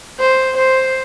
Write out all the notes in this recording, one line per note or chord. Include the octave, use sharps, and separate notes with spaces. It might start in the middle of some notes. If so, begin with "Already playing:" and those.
C5
C5